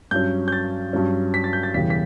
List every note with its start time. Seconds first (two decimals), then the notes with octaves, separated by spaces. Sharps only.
0.11 G2 F#3 C#4 G6
0.48 G6
0.52 A6
0.93 G2 F#3 C#4
1.34 B6
1.44 A6
1.53 G6
1.63 A6
1.74 E1 E2 C#3 E3 G3 B6
1.90 B6